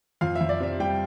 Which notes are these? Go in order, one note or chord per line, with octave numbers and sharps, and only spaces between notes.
F2 F5
E5
F2
D5
C3 E5
G3 G5